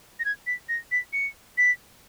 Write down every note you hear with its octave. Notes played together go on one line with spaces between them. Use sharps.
A#6
G#6
B6
A#6
B6
C#7
B6